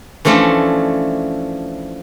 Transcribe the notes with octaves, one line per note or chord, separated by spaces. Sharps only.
E3 F3 A3 C#4 D4